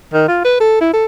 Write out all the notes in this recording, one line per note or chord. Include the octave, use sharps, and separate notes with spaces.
D#3
F4
B4
A4
E4
A4